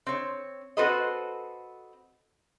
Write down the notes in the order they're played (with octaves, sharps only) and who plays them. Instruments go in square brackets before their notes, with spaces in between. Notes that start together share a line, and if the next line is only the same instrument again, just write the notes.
[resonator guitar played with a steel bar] C4 C#5
C4 F#4 A4 B4 C5 D#5